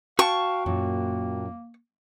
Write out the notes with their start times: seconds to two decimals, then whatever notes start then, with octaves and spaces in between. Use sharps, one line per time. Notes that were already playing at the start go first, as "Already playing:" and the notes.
0.19 F#4 F5 G5 A5 C#6
0.66 F#2 A#2 A#3